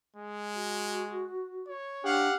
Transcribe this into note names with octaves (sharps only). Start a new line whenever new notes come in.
G#3
F#4
C#5
D4 G4 F5 F#5